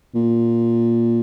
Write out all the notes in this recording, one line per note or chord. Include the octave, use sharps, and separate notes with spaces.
A#2